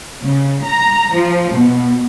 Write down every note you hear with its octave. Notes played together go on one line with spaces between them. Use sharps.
C#3
A#5
F3
B2